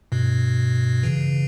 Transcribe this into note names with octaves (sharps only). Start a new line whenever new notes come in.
G2 B2
C#3 E3